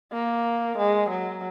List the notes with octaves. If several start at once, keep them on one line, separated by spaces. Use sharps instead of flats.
A#3
G#3
F#3